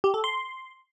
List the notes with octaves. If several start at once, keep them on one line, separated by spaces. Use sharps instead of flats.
G4
A4
C6